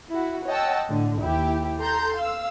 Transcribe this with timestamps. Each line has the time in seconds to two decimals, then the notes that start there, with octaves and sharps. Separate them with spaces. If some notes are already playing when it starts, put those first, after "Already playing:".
0.11 E4 F#4
0.47 C#5 D#5 F#5 G5 A5 E6
0.89 A2 D3
1.21 D#2 E4 G4
1.79 A4 A#5 C6 G6
2.17 F5 E6